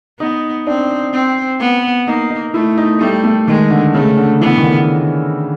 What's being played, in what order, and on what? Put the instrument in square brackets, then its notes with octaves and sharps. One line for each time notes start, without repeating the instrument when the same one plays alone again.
[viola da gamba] B3 [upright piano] D#4
[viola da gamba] C4 [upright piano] D4
[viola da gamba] C4
B3
[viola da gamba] A#3 [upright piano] D#4
[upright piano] D#4
[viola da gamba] A3 [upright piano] E4
[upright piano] D#4
[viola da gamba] G3 [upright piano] A3
[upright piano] A3
[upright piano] D#3 [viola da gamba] G#3
[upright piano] D3
[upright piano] C#3 [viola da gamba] A3
[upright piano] D3
[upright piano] E3 [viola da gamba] B3
[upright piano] D#3
D3